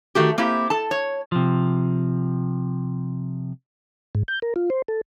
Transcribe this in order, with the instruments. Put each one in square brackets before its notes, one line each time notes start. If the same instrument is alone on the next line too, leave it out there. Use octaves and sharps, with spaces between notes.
[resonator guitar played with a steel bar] D#3 A3 F#4 G4
A#3 C4 E4 G4
A4 A5
C#5
[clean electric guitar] C3 F3
[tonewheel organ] G#2
G6
A#4
F4
C5
A4